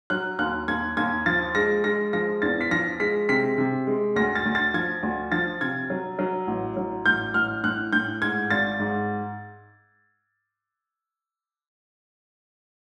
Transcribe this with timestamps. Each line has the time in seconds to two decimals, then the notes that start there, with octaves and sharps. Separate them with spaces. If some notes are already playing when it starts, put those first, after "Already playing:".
0.10 F#3 F#6
0.39 D#2 F#6
0.68 D#2 G#6
0.97 D#2 G#6
1.26 F3 A6
1.55 G#3 A#6
1.84 G#3 A#6
2.13 F3 A#6
2.42 E2 A6
2.61 B6
2.71 F3 A#6
3.00 G#3 B6
3.29 C3 B6
3.58 C3
3.87 G#3
4.16 D2 A#6
4.35 A6
4.45 D2
4.55 A6
4.74 F3 G#6
5.03 D2
5.32 F3 A6
5.61 C3 G#6
5.90 F#3
6.19 F#3
6.47 A1
6.77 F#3
7.06 A1 G6
7.34 A1 F6
7.64 A2 F#6
7.93 A2 G6
8.22 G#2 G#6
8.50 G#1 A6
8.79 G#2